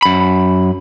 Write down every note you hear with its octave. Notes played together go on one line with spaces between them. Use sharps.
F#2 B5